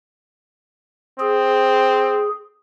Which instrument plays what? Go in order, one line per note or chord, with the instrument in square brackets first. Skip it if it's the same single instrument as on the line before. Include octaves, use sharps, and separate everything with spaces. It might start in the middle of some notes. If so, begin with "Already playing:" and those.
[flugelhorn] C4 [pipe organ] G#4